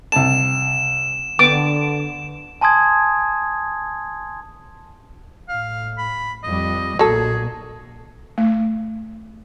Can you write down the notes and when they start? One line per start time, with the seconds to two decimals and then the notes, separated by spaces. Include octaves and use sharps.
0.12 C2 A5 E7
1.39 D3 B3 D6
2.61 G#5 A5 C6 D#6 G#6
5.49 A2 F5
5.98 B5
6.44 F2 G3 D#5
6.99 B1 A#2 F#3 G#4 A4
8.38 A3